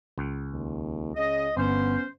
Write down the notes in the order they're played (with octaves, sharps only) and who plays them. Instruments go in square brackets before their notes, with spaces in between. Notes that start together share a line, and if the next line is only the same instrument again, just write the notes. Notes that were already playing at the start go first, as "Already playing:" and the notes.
[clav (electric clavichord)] C#2
[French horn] D#2
[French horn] C#3 [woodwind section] D#5
[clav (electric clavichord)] G1 [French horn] B3 [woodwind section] C#4 C5